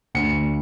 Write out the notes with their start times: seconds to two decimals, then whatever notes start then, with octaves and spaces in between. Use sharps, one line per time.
0.15 D2 C#7